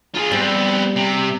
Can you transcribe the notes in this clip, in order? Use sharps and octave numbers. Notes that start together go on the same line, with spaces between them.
F4 G#4
G3 B3 C4
C3